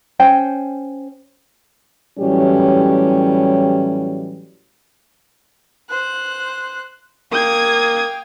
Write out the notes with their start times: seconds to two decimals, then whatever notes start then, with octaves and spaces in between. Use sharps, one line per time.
0.20 C#4 C5 G5
2.18 A2 E3 F#3 G3 C#4 G4
5.90 C5 F#6
7.32 A#3 F5 G5 D#6 G#6